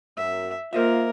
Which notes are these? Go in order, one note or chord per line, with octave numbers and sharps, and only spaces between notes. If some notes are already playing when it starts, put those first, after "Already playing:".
F#2 E5
A#3 F4 A#4 C5 D#5 E5